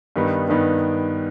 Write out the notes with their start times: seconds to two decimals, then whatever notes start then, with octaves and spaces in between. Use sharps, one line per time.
0.16 G2 D#3 G3 B3 D#4
0.49 G2 D#3 G3 B3 D#4